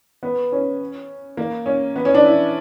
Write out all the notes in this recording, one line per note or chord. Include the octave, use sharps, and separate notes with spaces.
B3
C#4
A#3
C#4
B3
C#4
D4
E4